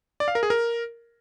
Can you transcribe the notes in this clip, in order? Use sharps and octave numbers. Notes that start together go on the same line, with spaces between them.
D5
F5
A#4
G#4
A#4